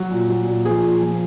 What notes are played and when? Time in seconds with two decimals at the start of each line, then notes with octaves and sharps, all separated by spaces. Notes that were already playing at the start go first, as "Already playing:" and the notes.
Already playing: F#3
0.11 A#2
0.29 F#3
0.47 A#2
0.65 F3 G#4
0.83 A#2
1.01 F3